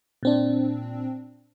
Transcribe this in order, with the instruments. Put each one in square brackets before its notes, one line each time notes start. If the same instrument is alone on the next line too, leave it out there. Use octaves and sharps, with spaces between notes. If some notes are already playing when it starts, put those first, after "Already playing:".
[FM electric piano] A#2 C4 D4